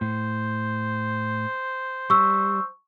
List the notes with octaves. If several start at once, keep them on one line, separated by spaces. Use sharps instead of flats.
A2 C5
G3 C#6 E6